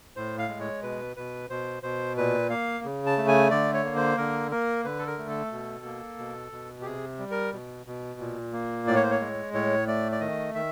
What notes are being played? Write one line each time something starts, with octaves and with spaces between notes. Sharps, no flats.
A2 C5
F5
G#3
C#5
B2 B4
B2 B4
B2 C5
B2 C5
A#2 B4
A#3 F5
C#3
A5
A3
G#5
D3 D5
C#5
A#3
C5
D3 A#4
A#3 A#4
D3 B4
A4
A#4
A3
A4
B2
A#3
B2
B2
G4
C3 G#4
G3
A#4
B2
B2
A#2
A#3
A2 D5
C#5
C5
C#5
G#3
A2 C#5
A3 D5
D5
D#3 D#5
D#3 E5